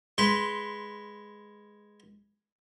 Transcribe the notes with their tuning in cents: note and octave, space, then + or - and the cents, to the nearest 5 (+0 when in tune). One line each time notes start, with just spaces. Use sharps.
G#3 +0 B4 +0 C6 +0